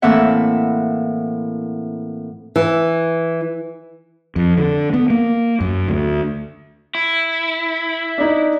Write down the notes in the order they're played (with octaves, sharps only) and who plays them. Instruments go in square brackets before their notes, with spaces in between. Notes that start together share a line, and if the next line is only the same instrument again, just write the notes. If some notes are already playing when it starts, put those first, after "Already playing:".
[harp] A2 E3 A#3 C4 E5 F#5
[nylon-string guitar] E3
[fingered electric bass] F2
D3
B3
A#3
F#2
D2
[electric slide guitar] E4
[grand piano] D4 D#4